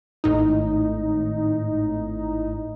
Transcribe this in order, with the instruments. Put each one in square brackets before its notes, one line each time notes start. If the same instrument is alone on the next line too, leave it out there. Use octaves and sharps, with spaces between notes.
[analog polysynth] G#1 A2 D#4